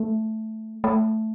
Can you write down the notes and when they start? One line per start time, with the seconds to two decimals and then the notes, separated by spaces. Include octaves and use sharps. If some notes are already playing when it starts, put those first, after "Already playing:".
Already playing: A3
0.84 A3